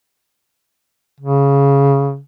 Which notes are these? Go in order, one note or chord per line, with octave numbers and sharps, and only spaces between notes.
C#3